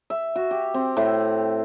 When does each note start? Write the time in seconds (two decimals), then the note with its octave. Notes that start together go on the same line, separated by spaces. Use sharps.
0.10 E5
0.36 F#4
0.51 G4
0.74 C4
0.97 A2